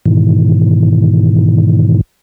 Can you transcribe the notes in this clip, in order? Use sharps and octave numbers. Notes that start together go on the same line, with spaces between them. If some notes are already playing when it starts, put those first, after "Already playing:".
G#2 B2 D#3 E3